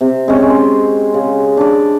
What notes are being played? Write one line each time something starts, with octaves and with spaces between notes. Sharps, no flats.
C3
G#3 C4 C#4
C6
C#3
D4 D5